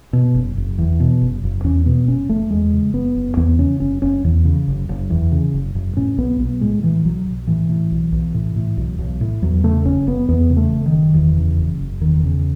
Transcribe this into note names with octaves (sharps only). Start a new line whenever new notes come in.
B2
F#1
F#1
E2
B2
F#1
F#1
E2 C#4
B2 B3
F#1 C#4
F#1 A3
E2 G#3
C#3
F#1 B3
F#1
E2 B3
C#3 C#4
F#1 C#4
F#1 C#4
E2
C#3
F#1
F#1
E2
C#3
F#1
F#1
A2 C#4
B1 B3
B1 B3
A2 G#3
A2 E3
B1 F#3
B1
A2 E3
A2
B1
B1
A2
A2
B1
B1
A2
E2 F#3
C#3 A3
F#1 C#4
F#1 B3
E2 B3
C#3
A3
F#1
D#3
F#1
E2
C#3
F#1
F#1
E2 D#3
C#3